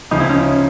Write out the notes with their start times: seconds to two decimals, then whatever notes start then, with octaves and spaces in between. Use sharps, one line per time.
0.11 D2 C#3 F3 D#4
0.20 E4
0.29 C#4 D#4